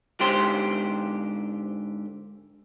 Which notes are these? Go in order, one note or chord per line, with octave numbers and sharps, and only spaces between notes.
G#2 D3 G4 C5 C6